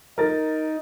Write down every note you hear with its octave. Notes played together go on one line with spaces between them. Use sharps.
D#4 A#4 A6